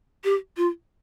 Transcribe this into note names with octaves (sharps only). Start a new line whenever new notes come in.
G4
F4